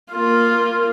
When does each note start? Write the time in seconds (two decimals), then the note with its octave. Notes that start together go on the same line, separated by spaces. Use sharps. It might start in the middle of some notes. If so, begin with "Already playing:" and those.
0.12 A#3 F4